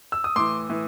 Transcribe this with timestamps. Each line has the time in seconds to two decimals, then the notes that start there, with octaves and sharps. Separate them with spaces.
0.12 E6
0.24 D#6
0.36 A2 E3 C6 D6
0.70 A2 E3